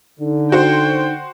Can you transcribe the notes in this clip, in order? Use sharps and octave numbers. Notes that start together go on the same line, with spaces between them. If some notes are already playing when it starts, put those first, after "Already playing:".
D3 D#4
F#4 C5 G5